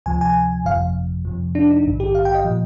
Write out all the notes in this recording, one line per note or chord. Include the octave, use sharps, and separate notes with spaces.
D2 C3 F3 G#5
G#5
G1 F2 C3 F3 F5
F2 C3 F3
D4
D#4
A#1 G#2 D#3
G4
F5
G5
D#5
A#2 F3